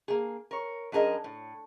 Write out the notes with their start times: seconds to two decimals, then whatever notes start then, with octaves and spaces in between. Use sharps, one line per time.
0.08 A#3 G#4
0.51 A#4 C#5
0.92 F#2 D4 G#4 A#4 D#5
1.24 A2